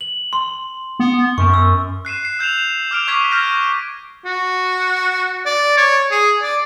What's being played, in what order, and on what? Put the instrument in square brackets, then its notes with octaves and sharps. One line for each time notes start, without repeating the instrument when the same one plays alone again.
[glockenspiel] F#7
C6
[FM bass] B3
[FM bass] F#2 [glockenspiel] C#6
[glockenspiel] E6
[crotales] F#6 C7 D#7 E7
C7
E6 G6 E7 F7
D6 F6 G6 D7 F7
C#6 D6 G#6 B6 F7
F6 G6 A#6 D#7
[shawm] F#4
D5
C#5
G#4
D5